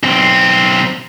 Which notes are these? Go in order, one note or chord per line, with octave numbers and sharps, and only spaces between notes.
B1 C4